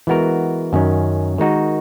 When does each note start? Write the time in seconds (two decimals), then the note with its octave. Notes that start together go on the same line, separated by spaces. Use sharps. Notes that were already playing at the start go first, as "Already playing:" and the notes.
0.07 E3 G#3 B3 F#4 A#4
0.73 F#2 D#3 F#3 C#4
1.38 D#3 G#3 D#4 F#4 A#4